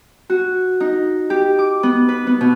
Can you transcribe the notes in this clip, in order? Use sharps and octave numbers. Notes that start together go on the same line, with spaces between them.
F#4
D#4
G4
D6
B3
B4
B3
B2